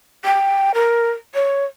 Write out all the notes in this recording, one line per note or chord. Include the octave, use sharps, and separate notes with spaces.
G5
A#4
C#5